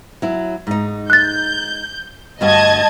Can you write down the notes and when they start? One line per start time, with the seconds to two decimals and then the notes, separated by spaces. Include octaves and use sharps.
0.22 F#3 E4
0.67 G#2 D#4
1.10 F#6 G6 A6
2.41 D2 G2 F#4 D#5 A5 G#6